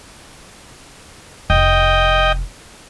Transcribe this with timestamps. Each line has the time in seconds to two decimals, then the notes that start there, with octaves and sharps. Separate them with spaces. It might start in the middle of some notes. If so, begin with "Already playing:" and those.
1.50 F1 D#5 G5